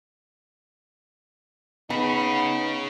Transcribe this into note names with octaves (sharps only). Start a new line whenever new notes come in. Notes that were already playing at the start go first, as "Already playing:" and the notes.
B3 C#4 D#4 G#4 B5